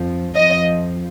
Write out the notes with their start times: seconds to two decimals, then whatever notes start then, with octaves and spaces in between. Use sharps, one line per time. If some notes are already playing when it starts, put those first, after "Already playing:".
Already playing: F2 F3
0.35 F2 F3 D#5